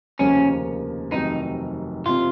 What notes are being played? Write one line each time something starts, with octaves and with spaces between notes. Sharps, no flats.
F1 D#2 C#3 F3 A#3 C#4
F1 F2 C3 D#3 F#3 D#4
F#1 F2 C3 F4